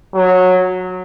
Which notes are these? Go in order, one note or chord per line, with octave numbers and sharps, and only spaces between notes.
F#3